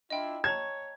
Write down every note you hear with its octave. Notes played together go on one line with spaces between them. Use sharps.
D4 E4 F4 D#5 G5
C#5 A5 A#5 G#6